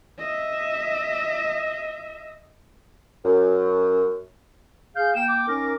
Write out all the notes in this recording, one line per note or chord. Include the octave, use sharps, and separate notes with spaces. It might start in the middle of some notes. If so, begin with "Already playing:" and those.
D#5 E5
F#2
G#4 F5 G6
A#3 G5 E7
D6
C#4 D#4 A#4